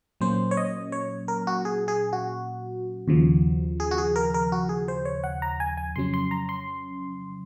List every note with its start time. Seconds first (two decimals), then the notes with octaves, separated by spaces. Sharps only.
0.21 A#2 F#3 A#3 C#4 C5
0.51 C#5
0.57 D#5
0.92 C#5
1.28 A#4
1.47 F#4
1.65 G#4
1.88 G#4
2.13 F#4
3.08 D#2 C#3 F3
3.80 G#4
3.91 F#4
3.98 G#4
4.16 A#4
4.34 A#4
4.52 F#4
4.69 G#4
4.88 C5
5.05 C#5
5.24 F#5
5.42 A#5
5.60 G#5
5.77 G#5
5.96 F2 C#3 F#3 C#4 C6
6.14 C6
6.31 A#5
6.49 C6